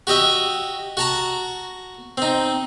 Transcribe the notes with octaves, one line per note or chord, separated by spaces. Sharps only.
F#4 G4 D#5 E5
F#4 A5 A#5
C4 D#4